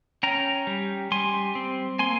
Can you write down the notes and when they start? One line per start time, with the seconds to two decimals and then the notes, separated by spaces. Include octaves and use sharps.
0.23 C#4 G5 A#5
0.67 G3
1.12 G3 G#5 C6
1.55 C4
1.99 A#3 G#5 C6